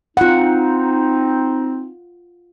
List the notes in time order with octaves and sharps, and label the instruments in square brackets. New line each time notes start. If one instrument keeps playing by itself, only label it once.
[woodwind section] C4 D#4 [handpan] F4 F#5